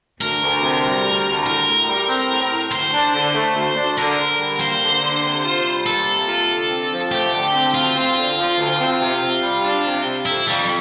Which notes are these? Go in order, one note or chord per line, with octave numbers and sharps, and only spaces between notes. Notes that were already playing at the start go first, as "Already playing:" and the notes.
D2 A#4
D2
C3
G3
D2
D2
A2 A#4
A2
G3
C4
A2
A2
D2 C5
D4
D3
A3
D2
D4
D3 A#4
D3
G3
A#3 C5
D3
D3
C3
F4
G3
A#3 A4
C3
F4
D3
C4
F3
A3 G4
D3
C4
D2 F4
C4
D3
F3
D2
C4
C3
C3
G3
D4
C3
C3
F2 E4
F2 G3